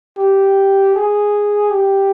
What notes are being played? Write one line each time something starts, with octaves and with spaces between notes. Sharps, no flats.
G4
G#4
G4